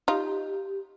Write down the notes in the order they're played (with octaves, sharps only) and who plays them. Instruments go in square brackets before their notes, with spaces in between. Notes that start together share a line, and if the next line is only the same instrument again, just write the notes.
[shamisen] D#4 F4 [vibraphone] G4